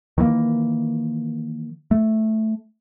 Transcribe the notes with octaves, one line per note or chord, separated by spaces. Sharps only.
D#3 E3 A3 A#3
A3